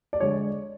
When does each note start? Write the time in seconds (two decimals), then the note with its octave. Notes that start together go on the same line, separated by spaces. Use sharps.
0.13 D5
0.20 D3 G#3 C#5